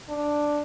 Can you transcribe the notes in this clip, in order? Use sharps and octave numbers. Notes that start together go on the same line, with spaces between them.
D4